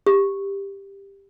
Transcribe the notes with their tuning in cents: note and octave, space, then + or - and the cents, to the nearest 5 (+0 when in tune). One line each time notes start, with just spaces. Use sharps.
G4 +10